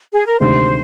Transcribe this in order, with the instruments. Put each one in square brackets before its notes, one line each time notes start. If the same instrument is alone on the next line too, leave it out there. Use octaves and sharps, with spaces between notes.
[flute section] G#4
A#4
[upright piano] D2 C3 D#3 G#3 [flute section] C5